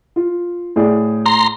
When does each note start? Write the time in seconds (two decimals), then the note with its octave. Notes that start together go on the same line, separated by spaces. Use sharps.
0.16 F4
0.76 A2 G#4 D5
1.26 A#5 C6